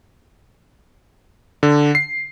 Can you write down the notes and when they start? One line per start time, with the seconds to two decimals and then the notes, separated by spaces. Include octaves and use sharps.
1.63 D3
1.95 C7